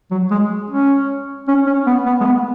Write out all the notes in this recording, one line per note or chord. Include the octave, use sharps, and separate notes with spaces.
F#3
G#3
C#4
C#4
C#4
B3
B3
G#3
B3